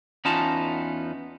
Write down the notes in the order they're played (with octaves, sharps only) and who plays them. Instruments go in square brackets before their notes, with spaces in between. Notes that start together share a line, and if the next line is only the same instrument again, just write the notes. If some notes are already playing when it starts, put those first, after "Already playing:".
[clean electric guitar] E2 B3 C#4 D#4 F4 A5